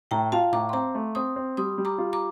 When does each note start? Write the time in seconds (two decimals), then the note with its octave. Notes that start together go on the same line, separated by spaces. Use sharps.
0.11 A2 G5 A#5
0.32 F4 F5 A5
0.52 A2 A#5 D6
0.69 C6
0.73 C4 A#5 D6
0.95 A3
1.15 C4 C6 D#6
1.36 C4
1.57 G3 C6 D#6
1.78 G3
1.85 A#5 D6
1.98 F4
2.13 A#5 D6